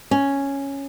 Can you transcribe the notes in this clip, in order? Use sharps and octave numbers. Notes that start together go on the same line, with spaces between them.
C#4